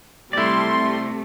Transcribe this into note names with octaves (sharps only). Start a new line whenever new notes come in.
C3 G3 A3 E4 D5 C6